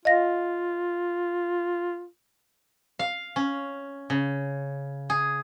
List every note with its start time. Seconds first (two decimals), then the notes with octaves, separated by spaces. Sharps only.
0.05 F4 D#5 F5 A#6
2.99 F5
3.36 C#4
4.10 C#3
5.10 G#4